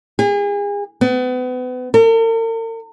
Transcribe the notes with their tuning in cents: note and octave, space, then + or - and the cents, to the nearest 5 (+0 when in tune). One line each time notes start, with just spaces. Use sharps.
G#4 -35
B3 +35
A#4 -45